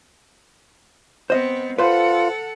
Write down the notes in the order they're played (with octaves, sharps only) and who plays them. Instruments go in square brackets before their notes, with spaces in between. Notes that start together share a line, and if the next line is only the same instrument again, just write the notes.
[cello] B3 C4 [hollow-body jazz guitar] C5 D#5
[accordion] F4 [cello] A4 F#5 [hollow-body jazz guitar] B4 C5